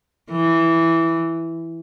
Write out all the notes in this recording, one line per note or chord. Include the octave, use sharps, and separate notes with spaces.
E3